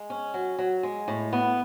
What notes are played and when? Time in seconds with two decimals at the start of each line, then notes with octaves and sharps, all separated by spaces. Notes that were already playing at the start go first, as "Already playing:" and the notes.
Already playing: G#3
0.10 C#4
0.34 F#3
0.58 F#3
0.83 G#3
1.08 A2
1.33 B3